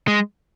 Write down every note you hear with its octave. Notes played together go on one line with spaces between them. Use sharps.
G#3